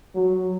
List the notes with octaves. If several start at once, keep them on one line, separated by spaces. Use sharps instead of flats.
F#3